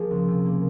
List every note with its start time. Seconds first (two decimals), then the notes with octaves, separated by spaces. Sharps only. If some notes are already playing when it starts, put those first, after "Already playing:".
Already playing: F3 A#3 G#4
0.11 C#2
0.28 C3
0.45 A#3